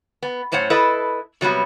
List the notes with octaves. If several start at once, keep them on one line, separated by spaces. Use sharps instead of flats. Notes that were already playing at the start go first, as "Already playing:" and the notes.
B3
F#2 A2 C5 C#5 F#5
E4 A4 B4 D#5
C3 F#3 G3 B3 F#4